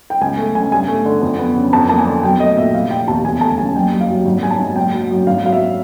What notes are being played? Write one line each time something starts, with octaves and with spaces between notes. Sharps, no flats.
G5
C#2 G#5
A3
C#3 G#5
G2 G#5
A3
D3
F2
B3
C#3
F2 A5
A#3 A5
G#5
D3
B1 G5
A3 D#5
A#2 E5
F1 F5
F1 G5
D#2 A5
E2 G#5
A3 A5
C#3 G#5
F#1 G5
G3
F5
F#2
G#1
G3 G#5
A5
G#2
F#1 G5
F#3
F#2
G#1 F5
F#3 F5
E5